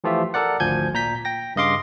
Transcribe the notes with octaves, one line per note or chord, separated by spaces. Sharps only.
E3 F3 A3 F4 G4 E5
A4 A#4 D5 F#5
G#1 D2 F3 G#5 G6 G#6
A#2 A#5 G6 B6
G5 A#6
G2 C#3 D#5 F5 C6 D6